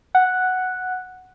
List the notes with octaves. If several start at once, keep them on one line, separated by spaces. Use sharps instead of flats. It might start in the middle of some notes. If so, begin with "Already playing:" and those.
F#5